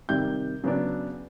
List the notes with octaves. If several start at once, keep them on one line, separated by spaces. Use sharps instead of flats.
C3 D#3 G3 G6
C#3 F#3 B3 D4